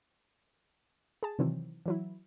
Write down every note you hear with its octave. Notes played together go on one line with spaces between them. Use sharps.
G#4 A5
C3 D#3 E3 F#3 C4
E3 F#3 E4